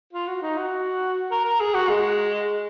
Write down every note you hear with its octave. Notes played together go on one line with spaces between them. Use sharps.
F4
F#4
D#4
F#4
A#4
A#4
G#4
F#4
G#3